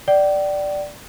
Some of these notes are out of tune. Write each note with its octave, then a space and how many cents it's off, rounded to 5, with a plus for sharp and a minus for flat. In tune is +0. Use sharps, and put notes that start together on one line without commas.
D5 +0 G5 -40